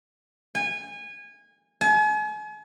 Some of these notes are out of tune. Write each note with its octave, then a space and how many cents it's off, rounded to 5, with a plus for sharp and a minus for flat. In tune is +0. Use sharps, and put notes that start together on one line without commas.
G#5 -25
G#5 +40